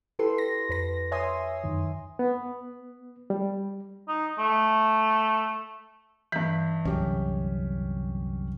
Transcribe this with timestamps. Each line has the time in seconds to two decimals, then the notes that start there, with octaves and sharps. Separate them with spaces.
0.19 E4 G4 A4 B4 C6
0.38 A#6
0.69 F2 B4 A#6
1.12 C#5 E5 G#5 C6 D#6
1.64 F#2 D#3
2.19 B3
3.30 G3
4.08 D#4
4.39 A3
6.32 G2 E3 B6
6.85 C2 F#2 D3 C#4 G4